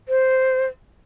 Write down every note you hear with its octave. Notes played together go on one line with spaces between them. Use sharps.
C5